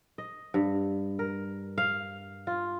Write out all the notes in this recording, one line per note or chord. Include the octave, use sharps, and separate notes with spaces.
D#5
G2
A#4
F5
F4